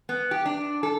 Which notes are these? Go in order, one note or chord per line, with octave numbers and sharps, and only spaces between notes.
B3
G4
D4
A4